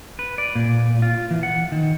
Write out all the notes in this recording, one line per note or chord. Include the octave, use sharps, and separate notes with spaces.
B4
D5
A#2
F4
E3
F#5
D#3